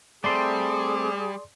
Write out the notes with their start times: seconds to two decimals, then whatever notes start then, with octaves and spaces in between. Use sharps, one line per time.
0.24 G3 A3 C4 G#4 D5 C6